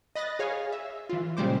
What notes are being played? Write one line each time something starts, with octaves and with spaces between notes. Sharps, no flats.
D#5 B5 F#6 A6 A#6
G#4 C#5 F5 G#5
E5
E3 F4
A#2 C#3 G3 G#3 C5 D6